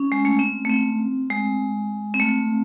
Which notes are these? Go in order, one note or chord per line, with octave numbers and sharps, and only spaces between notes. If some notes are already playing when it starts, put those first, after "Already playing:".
Already playing: C#4
G#3
A3
C4
A3
C4
G#3
C4
A3